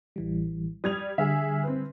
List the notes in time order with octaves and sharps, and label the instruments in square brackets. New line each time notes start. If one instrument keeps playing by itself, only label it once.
[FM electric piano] A1 E3 G3
[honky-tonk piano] G3 G#6 F7 [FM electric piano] D#6
[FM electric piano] D3 G3 F6 [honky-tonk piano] G#4 E5
[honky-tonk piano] C4 B4